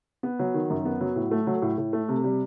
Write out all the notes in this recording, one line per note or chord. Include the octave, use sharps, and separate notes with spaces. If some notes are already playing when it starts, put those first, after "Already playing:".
B3
F#3
D#3
F#2
B3
F#3
A2
A3
F#3
A2
A2
A3
C3
G3